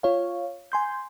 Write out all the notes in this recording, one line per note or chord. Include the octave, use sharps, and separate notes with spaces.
F4 C#5 F5
G#5 C6 G6